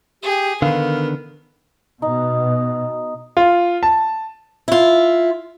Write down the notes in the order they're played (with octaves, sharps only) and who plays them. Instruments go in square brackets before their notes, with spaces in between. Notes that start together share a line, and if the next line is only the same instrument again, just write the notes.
[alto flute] G4 [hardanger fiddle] G#4
[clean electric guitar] D3 D#3 [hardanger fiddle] B3 [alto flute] A#4 [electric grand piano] F5
[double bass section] B2 [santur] D#4
[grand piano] F4
A5
[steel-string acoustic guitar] E4 F4